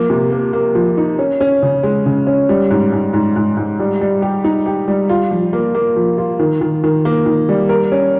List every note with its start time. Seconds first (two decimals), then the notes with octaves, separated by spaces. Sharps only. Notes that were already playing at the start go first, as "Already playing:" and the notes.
Already playing: F3 A#3
0.10 C3
0.32 A#3
0.53 A#3
0.75 F3
0.98 D#4
1.19 C#4
1.41 C#4
1.62 C#3
1.83 G#3
2.06 C#3
2.27 C#4
2.49 G3
2.71 G#2
2.92 G#2
3.14 G#2
3.36 G#2
3.57 G#2
3.79 G3
4.01 G3
4.22 G4
4.44 D#4
4.66 G4
4.88 G3
5.09 F4
5.31 F3
5.53 A#3
5.75 A#3
5.96 F3
6.18 F4
6.39 D#3
6.61 D#3
6.84 D#3
7.05 A#3
7.26 D#3
7.49 G3
7.69 A#4
7.92 C#4